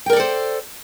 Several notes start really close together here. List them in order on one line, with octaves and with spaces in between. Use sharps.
G5 A#4 D5 A4 C5